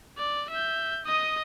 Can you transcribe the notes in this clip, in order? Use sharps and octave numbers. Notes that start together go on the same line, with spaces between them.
D5
E5 G6
D#5 D#6